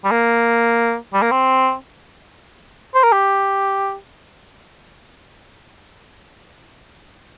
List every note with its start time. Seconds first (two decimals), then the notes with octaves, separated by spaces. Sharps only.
0.04 G3
0.11 A#3
1.14 G3
1.22 A#3
1.31 C4
2.95 C5
3.04 A#4
3.12 G4